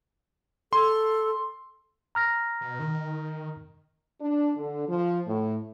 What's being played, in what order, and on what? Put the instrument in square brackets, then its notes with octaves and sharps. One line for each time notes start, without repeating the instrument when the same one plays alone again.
[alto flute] A4 [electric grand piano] C6
[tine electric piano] A#5 F6 A#6
[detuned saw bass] B2
D#3
[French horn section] D4
D3
F3
A2